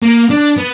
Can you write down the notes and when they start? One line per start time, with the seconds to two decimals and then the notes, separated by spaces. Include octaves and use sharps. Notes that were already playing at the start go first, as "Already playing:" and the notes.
0.02 A#3
0.30 D4
0.58 B3